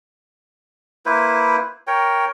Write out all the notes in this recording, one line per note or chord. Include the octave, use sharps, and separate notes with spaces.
A#3 E4 B4 C5
A#4 C#5 G5